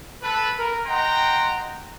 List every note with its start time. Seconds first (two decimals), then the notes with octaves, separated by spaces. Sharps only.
0.23 A4 B4
0.57 A#4
0.86 D#5 F#5 G5 A#5 C6